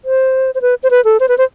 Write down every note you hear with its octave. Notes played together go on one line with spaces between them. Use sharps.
C5
C5
B4
C5
B4
A4
C5
B4
C5